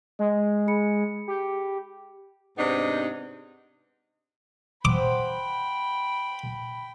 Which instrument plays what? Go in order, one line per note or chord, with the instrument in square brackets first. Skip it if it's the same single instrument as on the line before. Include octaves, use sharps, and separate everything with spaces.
[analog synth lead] G#3 [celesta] D#5
[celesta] G#4 B5 C#7
[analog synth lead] G4
[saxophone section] G#2 C3 B3 D4 D#4
[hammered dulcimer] C5 F#5 [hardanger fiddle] G5 B5 [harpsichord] D6